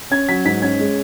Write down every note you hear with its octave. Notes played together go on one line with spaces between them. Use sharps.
C#4 G#6
F#3 B6
G#2 B6
C#4 G#6
G#3